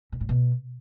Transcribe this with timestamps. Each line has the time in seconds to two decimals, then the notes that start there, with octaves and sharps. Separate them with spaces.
0.12 B2
0.21 A2
0.29 B2